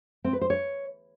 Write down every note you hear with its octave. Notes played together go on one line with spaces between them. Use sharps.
C4
B4
C5
C#5